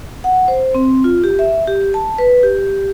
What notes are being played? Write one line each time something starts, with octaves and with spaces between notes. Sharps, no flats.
F#5
C5
C4
F4
G4
E5
G4
A5
B4
G4